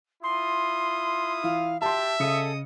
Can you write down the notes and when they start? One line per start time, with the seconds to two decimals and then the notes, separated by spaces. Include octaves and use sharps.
0.23 E4 F4 C6 D#6
1.44 E3 F5
1.82 G4 E5 A5 C6
2.20 C#3 G#4 A4 D#5 D#6 C#7